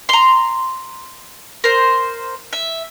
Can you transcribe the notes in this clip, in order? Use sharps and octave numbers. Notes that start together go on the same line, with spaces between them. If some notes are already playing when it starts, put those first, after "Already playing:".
A#5 C6
A#4 C5
E5